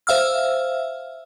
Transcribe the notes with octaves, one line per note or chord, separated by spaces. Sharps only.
C5 E5 F5 E6 F6